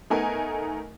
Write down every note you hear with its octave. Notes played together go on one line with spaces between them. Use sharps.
A3 B3 D#4 A#4 G#5